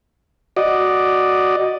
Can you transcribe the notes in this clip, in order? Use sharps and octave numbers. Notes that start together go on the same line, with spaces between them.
F#4 D5 D#5